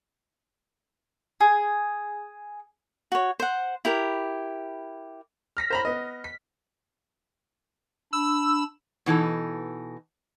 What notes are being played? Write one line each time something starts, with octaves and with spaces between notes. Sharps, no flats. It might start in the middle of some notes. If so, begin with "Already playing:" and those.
G#4
F#4 C#5
C5 F#5
E4 G4 A#4
F6 A#6 B6
C5 A#5 B5
B3 D#5
B6
D4 B5 E6
B2 E3 D#4 A4